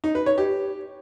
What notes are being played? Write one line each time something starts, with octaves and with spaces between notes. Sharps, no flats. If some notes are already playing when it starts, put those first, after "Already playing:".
D#4
B4
C#5
G4